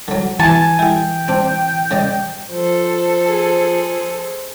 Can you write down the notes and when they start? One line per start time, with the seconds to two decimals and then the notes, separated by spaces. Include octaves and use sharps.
0.08 D3 F#3
0.39 E3 G#5 A5 C#6
0.79 E4 G#4 G5
1.28 C4 D4
1.91 C#3 D5 D#5
2.51 F3 A4 C5
3.26 G#4